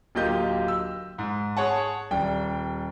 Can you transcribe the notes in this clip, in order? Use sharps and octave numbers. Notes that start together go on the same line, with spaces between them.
D1 A#3 F4 G4 D#5 G6
E6
G#2
G#4 C#5 F#5 A5
D#1 G3 G5